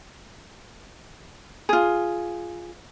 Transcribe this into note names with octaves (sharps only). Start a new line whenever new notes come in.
F4 G#4